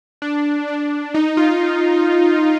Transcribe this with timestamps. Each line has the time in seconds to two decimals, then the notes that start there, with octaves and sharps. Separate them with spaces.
0.22 D4
0.68 D4
1.14 D#4
1.37 F4